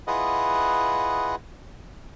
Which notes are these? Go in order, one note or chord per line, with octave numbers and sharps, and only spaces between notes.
E4 F4 G#4 B4 D#5 F#5